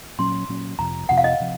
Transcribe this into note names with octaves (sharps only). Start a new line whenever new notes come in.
A#2 F#3 C#4 C6
A#2 F#3 C#4
F2 C3 F3 A#5
F2 C3 F3 F#5
F5
D#5
C3 F3